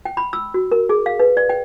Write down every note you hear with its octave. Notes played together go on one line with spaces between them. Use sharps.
G5
B5
E6
F#4
A#4
G#4
F5
B4
D5
G5